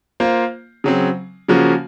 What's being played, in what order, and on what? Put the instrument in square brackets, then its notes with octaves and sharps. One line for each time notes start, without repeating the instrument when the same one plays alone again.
[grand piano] A#3 F4 C5
C#3 F#3 C4
C#3 F3 A#3 C#4 F#4